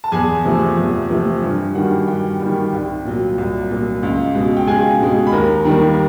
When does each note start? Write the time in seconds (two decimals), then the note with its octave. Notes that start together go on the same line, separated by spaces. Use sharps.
0.04 A5
0.12 E2 G#4 G#5
0.45 C3 F3 A3
0.78 E2
1.10 C3 F3 A3
1.43 G2
1.75 D#3 G3 F#4 F#5
2.07 G2 G4 G5
2.40 D#3 G3
2.72 C2
3.05 A#2 F#3
3.38 C2
3.71 A#2 F#3
4.03 C#2
4.35 B2 G#3
4.57 G5
4.67 C#2 G#4 G#5
5.01 B2 G#3
5.27 B5
5.32 D#2 A#4 A#5
5.65 D#3 G3 A#3